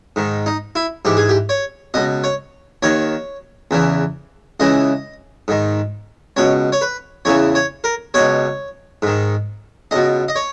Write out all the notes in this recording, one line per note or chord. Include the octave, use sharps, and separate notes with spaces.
G#2 D#3
D#4
E4
G#2 E3 G4
G#4
G4
C#5
C#2 B2 D#5
C#5
D#2 D#3 C#5
E2 C#3 E3
C#2 C#3 E3 D#5
G#2 D#3
C#2 B2 C#5
C#5
B4
E2 C#3 E3 C#5
C#5
A#4
C#2 B2 C#5
G#2 D#3
C#2 B2 D#5
D#5
C#5